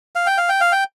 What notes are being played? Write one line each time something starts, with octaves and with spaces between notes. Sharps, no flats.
F5
G5
F5
G5
F5
G5